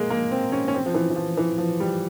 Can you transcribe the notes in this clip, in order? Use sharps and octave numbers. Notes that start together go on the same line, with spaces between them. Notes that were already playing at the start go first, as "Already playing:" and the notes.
Already playing: G#3 A#3
A#3
C4
C#4
C#4
C4
F3
E3
E3
F3
E3
F3
G3